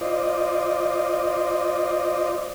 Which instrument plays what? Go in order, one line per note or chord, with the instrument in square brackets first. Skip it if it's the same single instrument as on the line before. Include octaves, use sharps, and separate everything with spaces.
[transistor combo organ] F4 C5 D5 D#5